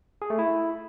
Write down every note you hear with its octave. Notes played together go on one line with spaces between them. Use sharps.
G#4
A3
E4